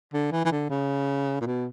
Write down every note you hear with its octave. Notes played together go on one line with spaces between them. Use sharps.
D3
E3
E3
D3
C#3
A#2
B2